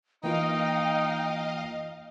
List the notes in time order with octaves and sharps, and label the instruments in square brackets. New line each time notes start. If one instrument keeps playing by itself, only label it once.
[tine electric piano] E3 A#3 F4 [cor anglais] D#4 [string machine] D#5 F5 [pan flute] G5